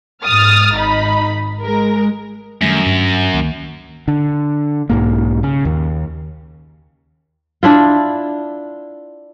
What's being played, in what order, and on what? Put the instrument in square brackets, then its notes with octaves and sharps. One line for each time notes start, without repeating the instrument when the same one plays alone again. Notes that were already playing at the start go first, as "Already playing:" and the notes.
[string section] G#2 D#6 F6 A6
G#1 D#4 B5
G#3 A#4
[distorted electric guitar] F#2 [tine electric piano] D#3 G3 A3
[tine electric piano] G2
C#2 D#3 A#3
[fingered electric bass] D3
B1 G#2 A#3
C#3
D#2
[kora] D4 E4 F4